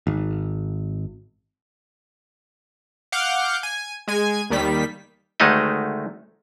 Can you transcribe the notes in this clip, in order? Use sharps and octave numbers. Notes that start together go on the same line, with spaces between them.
G#1
F5 F#5 D6 F6 G6
G#5
G#3 G#5 G#6
D#2 D#3 G3 B6
D2 D#3 G#3 A3 D#4 D#5